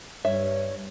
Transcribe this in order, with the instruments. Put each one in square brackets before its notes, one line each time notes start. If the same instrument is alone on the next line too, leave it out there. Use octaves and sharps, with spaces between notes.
[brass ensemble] G2 [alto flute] C#5 [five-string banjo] E5